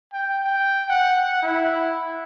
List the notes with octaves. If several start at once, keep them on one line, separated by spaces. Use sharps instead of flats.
G5
G5
F#5
E4